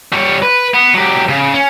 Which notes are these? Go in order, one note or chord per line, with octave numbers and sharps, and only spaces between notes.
G3 C#5
B4
B3
F#3 G4
C#3
C#4